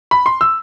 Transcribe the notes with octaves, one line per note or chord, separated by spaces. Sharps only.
B5
C6
E6